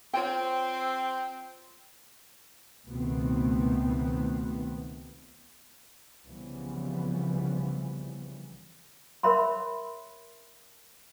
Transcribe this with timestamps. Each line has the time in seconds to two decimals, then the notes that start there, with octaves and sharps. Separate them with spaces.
0.13 C4 F4 C#5 G5
2.87 C#2 B2 D#3 A3 B3 C4
6.27 C2 C#3 E3 F3 G3 B3
9.23 A#4 C#5 E5 B5 C6